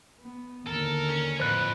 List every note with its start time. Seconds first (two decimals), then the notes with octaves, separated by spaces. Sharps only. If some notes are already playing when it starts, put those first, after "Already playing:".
0.21 B3
0.67 D#2 D3 A4 A#4
1.10 C#4
1.40 F2 A2 B4 C5 F#6